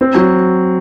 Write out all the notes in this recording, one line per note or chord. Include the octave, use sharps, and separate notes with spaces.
C4
F#3